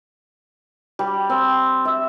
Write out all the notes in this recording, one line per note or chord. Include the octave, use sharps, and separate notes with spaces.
G3
C4
E5